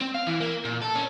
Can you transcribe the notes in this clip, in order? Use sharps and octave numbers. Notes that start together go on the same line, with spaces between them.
C4
F5
E3
A#3
A#2
A4
C#4